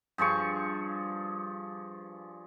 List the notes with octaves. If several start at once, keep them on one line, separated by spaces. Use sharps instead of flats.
G2 F3 G#4 C#6